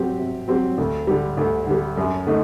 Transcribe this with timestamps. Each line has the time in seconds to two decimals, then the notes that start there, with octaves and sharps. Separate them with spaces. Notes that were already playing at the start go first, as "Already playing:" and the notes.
Already playing: C3 F#3 C4 G4
0.18 C3
0.48 F#3 C4 G4
0.78 D2
1.07 D3 G3
1.37 D2
1.67 D3 G3
1.97 F#2
2.27 D3 A3 D#4